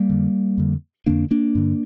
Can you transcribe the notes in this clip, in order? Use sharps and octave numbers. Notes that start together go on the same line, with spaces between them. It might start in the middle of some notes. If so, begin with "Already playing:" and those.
Already playing: G3 A#3
F2 D3
F2 D3
F2 D3 A#3 D4
A#3 D4
G2 D3